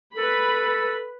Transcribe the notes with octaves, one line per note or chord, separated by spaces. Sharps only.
A4 B4 B5